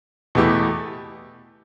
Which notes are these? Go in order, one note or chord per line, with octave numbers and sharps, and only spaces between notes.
E2 B2 A3 E4 G4